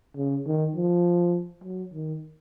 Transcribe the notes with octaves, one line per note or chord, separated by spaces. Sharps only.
C#3
D#3
F3
F#3
D#3